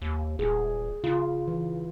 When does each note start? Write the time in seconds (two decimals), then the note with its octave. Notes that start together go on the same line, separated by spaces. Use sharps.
0.02 D#2
0.39 D#1 G#4
1.04 C#3 F4
1.48 E3